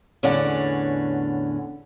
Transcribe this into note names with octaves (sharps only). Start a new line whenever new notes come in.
E2 A2 D3 C#4 D5 F#5